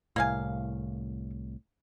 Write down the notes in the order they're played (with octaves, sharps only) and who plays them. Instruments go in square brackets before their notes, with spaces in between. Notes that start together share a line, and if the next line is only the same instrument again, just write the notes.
[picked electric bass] C2 A2 [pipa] A#3 F5 G#5